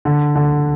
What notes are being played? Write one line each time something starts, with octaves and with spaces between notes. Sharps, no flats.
D3
D3